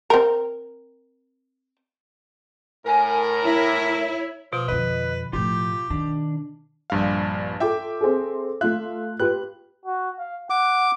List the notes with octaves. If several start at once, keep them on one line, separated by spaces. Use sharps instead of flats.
C4 A#4
A2 A#4 G#5
E4 C#5
B2 F3
F2 D3 B4 D#5
A2 F3 F4 G4 G6
D#3 D4
A#1 G2 F5
F4 A4 E5 G5 D6
C4 G#4 A4
A3 F4 E5 F5 F#6
F4 G4 B4 F#6
F#4
F5
F#5 D6